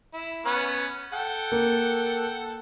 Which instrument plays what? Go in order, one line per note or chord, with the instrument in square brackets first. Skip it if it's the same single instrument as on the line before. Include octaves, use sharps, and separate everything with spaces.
[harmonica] E4
B3 C#4 B4
A4 F#5 G5
[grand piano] A#3